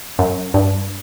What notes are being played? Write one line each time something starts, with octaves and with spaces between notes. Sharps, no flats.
F#2
G2